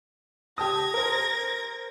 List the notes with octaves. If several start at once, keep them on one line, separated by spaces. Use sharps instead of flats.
G4 A5 D#6 G#6 A#6
A#4 C5